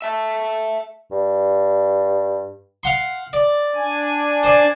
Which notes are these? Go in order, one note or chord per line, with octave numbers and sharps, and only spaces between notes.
E5 A5
G2
F5 F#5 C6
D5
D4 G#5
C5 D5